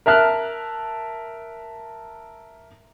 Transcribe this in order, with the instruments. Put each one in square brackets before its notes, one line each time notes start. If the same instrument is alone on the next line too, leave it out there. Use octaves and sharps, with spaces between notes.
[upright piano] A#4 E5 A5 F6 F#6